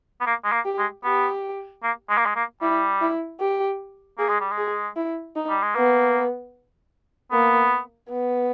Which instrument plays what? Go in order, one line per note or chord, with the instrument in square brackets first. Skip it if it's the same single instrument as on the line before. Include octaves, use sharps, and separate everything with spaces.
[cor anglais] B3
A#3
G#3
A#3
[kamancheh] G4
[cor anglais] G#3
[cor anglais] B3 [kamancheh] G4
[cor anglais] A#3
G#3
A#3
G#3
A#3
[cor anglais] G3 [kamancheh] E4
[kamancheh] E4
G4
[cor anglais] A#3 [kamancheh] G#4
[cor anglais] G#3
G3
G#3
[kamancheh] G#4
E4
D#4
[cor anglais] G3
G#3
[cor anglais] A#3 [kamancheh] B3
[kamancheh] A#3 [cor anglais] B3
[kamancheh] B3